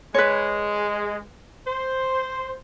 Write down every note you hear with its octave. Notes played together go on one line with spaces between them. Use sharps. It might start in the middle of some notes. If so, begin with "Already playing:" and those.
G#3 B4 C#5
C5